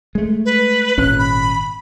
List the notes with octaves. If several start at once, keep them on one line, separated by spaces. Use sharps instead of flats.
G#3 A3
B4
G#1 A#2 C#4 F#6
B5